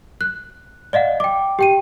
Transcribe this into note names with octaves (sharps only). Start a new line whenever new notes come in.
F#6
D5 D#5 F5 F#5
G5 D6
G4 G5 D#7